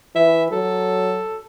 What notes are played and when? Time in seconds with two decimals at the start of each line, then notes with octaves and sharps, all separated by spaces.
0.16 E3 E5
0.52 F#3 A4